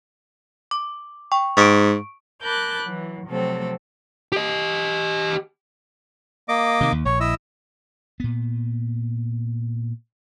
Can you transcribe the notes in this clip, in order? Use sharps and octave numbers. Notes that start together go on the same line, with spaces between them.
D6
G5 C#6
G#2 C#6 D7
A#4 A5 B5 D6 F#6 G6
E3 F#3
C3 F3 F#3 A3 C4 A4
G4 D#5
A#3 D#5 D6
C3 D#3
D#2
A#1 C#5
E4 D#5 E6
A#2 B3